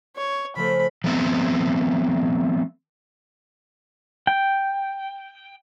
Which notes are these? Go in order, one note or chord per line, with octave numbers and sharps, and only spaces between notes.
C#5
C#3 F3 A3 E5 B5
F3 A3 B3 C4
G5